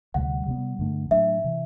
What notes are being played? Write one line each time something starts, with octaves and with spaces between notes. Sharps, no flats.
D2 C3 G3 F#5
C3 G3 B3
G2 D3 A3 D4
A2 F#3 A3 D4 E5
C3 E3